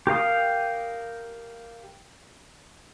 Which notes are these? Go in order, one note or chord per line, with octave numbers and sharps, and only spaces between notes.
G4 A#4 F5 D#6